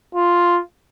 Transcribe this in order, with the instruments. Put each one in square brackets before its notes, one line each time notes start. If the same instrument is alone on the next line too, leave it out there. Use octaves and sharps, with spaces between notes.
[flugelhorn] F4